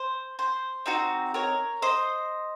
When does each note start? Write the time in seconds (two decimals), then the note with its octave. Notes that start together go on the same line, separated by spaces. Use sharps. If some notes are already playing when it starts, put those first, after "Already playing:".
Already playing: C5
0.39 C5
0.86 C4 D#4 F#4
1.34 A#4 C#5
1.82 C5 D#5